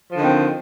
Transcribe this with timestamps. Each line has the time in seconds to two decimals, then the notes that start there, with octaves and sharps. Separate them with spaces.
0.11 F3
0.15 D3
0.19 D#3
0.23 C4